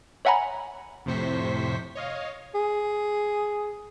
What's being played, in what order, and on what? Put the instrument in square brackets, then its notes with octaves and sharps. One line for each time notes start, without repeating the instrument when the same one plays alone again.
[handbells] C#5 E5 F#5 G#5 A#5 B5
[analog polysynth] F2 A2 C3 C5 C#6 B6
C#5 D#5 F5
[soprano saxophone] G#4